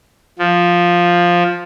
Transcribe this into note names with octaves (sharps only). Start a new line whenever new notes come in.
F3